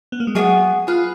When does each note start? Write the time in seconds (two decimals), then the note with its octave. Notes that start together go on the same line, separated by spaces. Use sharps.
0.12 B3
0.20 A#3
0.27 G#3
0.35 F#3 B3 D4 G#4
0.87 F4 G#4 B4 F5